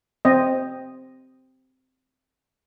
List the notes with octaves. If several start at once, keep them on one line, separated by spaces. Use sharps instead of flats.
C4 D#5